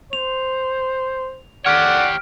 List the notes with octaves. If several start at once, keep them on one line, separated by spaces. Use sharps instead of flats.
C5 F7
G4 C#5 D5 F#5 F6 D7